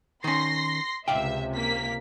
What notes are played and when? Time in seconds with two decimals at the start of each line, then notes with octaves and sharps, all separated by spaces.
0.24 D#3 C#4 C6 A#6 C7
1.08 C#2 C3 D5 E5 F5 G5
1.55 A#3 B6